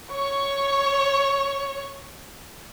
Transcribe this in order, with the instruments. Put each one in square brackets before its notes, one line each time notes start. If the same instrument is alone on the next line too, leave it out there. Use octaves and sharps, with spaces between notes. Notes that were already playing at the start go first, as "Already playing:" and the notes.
[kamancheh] C#5 C#6